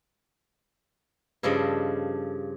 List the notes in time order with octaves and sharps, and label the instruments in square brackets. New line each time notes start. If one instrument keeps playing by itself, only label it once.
[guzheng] G2 C#3 F3 A4 D5 D#5